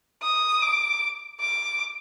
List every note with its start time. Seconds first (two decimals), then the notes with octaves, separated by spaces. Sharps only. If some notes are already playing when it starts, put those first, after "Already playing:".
0.23 D#6
0.62 D6
1.40 D6